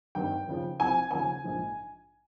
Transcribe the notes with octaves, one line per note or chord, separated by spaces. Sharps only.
G#1 G2 D#3 G5
D#2 C#3 F3
C2 C3 F3 G#5
D#2 C#3 F3 G#5
A#1 G#2 F3